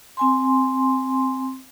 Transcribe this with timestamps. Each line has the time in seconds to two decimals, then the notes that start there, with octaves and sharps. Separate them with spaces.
0.17 C4 G#5 C6